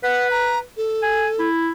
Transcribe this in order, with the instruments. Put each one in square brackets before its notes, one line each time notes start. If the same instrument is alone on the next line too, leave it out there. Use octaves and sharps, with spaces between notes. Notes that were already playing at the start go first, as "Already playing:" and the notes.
[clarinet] B4 [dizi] F#5
[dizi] A#5
A4
[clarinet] G#5
E4